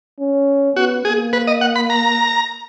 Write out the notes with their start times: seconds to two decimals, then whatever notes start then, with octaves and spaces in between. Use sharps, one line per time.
0.20 C#4
0.76 B3 F#4
1.05 A#3 G#4
1.33 B4
1.47 D#5
1.61 F#5
1.76 B5
1.90 A#5